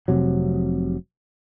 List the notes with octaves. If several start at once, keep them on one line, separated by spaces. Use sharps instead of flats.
F1 C3 F#3